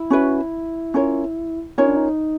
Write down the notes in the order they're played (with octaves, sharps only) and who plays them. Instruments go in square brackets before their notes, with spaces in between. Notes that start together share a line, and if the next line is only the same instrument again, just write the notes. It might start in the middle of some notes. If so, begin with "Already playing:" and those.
Already playing: [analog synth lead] E4
[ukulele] C#4 F#4 B4 E5
C#4 F4 A#4 C#5
[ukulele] C#4 F4 A#4 C#5 [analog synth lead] D#4
[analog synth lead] D4
D#4